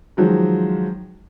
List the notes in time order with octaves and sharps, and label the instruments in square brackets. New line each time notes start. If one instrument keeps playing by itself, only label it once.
[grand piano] D#3 F3 F#3 G#3